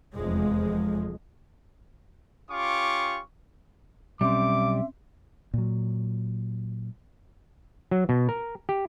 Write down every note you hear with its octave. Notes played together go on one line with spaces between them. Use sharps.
F1 E2 F3 G#3
C#4 F4 G4 F5 C#6 D6
B1 G3 C4 C#4 E5 C6 D6
A#2 F#3
F#3
B2
A#4
G4